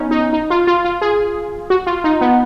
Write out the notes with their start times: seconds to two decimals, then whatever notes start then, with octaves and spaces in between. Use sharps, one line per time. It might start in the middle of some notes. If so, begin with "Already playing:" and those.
Already playing: B3 C#4 D#4
0.11 D#4
0.33 D#4
0.50 F4
0.67 F4
0.84 F4
1.02 G#4
1.70 F#4
1.87 F4
2.04 D#4
2.21 B3